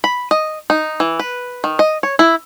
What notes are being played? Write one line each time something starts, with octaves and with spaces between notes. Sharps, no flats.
B5
D#5
D#4
E3
B4
D#3
D#5
C#5
E4